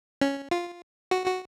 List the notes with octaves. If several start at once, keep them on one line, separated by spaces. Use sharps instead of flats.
C#4
F4
F#4
F#4